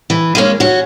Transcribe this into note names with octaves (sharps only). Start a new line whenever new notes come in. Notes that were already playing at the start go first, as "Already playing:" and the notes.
E3
G#3 A#3 C#4
C#4 F#4